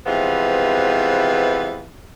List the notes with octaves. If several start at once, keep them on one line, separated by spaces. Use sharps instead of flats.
C3 E3 F3 G#3 B3